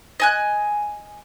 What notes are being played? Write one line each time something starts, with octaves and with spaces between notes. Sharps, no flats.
D#5 G#5 F#6